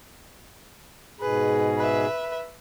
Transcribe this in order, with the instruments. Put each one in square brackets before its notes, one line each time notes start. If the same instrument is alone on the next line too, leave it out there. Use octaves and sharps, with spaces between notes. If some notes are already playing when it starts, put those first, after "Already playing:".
[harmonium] G#2 B2 G#4 [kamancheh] B4
[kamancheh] B4 E5